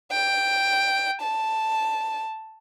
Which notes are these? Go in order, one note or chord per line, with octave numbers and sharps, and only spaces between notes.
G5
A5